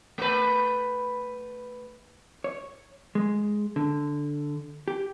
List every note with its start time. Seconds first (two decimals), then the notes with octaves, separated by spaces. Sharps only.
0.18 A3 B4
2.44 C#5
3.15 G#3
3.76 D3
4.88 G4